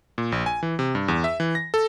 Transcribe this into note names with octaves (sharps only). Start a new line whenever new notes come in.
A#2
A#1
G#5
E3
C3
G2
E2
E5
E3
A#6
A4